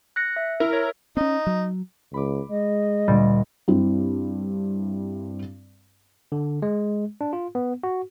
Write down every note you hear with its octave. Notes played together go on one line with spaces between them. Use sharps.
F#6 A#6 C#7
E5
E4 A#4
C#5
C4 C#4 D#4
F#3
C#2 B5 D6
G#3 D#5
D2 A#2 G3 D5
G2 C4 E4
D3
G#3
D4
F4
B3
F#4